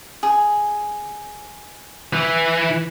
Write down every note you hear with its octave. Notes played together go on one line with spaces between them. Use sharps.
G#4
E3